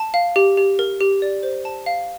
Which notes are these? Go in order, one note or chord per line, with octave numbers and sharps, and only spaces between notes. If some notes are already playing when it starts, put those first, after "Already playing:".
Already playing: A5
F5
G4
G4
A#4
G4
D5
C5
A5
F5